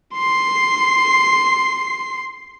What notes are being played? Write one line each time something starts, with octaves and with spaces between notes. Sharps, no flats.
C6 C7